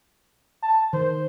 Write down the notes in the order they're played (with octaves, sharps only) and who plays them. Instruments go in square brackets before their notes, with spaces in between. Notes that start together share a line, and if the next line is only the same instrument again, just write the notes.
[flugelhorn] A5
[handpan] D#3 [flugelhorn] C5